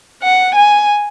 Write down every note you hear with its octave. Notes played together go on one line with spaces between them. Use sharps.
F#5
G#5